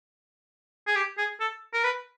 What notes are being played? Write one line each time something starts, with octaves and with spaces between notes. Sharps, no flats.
G#4
G4
G#4
A4
A#4
B4